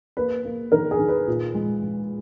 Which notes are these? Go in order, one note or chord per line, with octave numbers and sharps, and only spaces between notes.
A#3 B4
A#3
D#3 A#4
G#4
D#3
B4
A#2
G#3
G#3